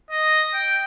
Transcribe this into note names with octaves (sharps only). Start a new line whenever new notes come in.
D#5
G5